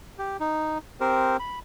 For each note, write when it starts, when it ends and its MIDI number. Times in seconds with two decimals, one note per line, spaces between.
0.18 0.37 67
0.40 0.78 63
1.00 1.37 60
1.00 1.37 67
1.00 1.37 70
1.00 1.37 72
1.39 1.59 83